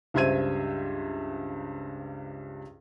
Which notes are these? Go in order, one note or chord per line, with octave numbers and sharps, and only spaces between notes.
C#2 G2 C5 E5 G#6 D#7